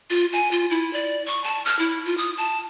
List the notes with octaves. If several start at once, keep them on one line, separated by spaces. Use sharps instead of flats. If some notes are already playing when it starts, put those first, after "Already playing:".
F4
G#5
F4
E4
D5
C#6
A5
F6
E4
F4
D#6
A5